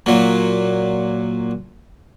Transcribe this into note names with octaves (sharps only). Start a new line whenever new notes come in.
A#2 F#3